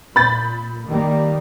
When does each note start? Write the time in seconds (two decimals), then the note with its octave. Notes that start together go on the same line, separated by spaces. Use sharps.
0.16 A#2 B5 G6 A6
0.87 D#3 G3 A#3